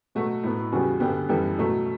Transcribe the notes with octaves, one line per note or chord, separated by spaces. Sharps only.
B2 F#3 A3 F#4
A2 F#3 B3
E2 C#3 G3 B3 F#4
G2 D3 G3 B3 G4
F#2 E3 G3 B3 A4
B2 F#3 A3